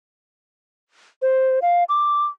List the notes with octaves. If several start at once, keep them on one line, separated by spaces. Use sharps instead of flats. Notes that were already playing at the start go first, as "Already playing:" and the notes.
C5
F5
D6